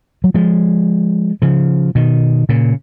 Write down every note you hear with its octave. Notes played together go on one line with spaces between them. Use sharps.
F#3
F3 G#3
C#3 F3
B2 D#3
A#2 C#3